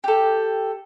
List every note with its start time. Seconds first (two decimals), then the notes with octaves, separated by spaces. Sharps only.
0.04 G4 A4